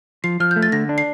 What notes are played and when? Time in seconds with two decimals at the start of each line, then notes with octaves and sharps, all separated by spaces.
0.24 F3 C7
0.40 F3 F6
0.51 G6
0.56 A3
0.63 A6
0.72 D3 A#6
0.89 D4
0.98 C7